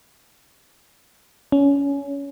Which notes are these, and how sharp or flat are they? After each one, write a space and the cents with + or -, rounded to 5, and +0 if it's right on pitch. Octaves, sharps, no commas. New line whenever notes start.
C#4 +20